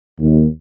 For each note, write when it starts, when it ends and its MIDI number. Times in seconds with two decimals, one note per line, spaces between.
0.19 0.46 39